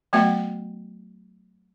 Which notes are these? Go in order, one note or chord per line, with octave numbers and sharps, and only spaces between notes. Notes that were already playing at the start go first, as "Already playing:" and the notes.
F#3 A3 B3 F#4 E5 F#5